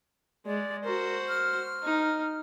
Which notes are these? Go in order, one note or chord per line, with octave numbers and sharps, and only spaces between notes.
G#3 D5
F#4 A#4 C5
F6
D#4